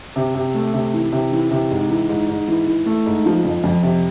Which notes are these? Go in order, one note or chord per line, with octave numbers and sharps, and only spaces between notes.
C3
C3
A3
C3
E3
C3
E3
C3
G#2
E3
G#2
G#2
E3
E3
A3
G#2
F3
F2
F2
C3